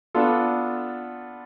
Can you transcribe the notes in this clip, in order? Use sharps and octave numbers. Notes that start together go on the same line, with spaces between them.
B3 D4 F4 A4